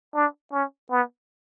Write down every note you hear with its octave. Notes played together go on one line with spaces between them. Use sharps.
D4
C#4
B3